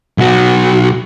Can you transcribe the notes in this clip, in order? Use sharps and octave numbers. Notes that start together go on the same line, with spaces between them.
B1 F#4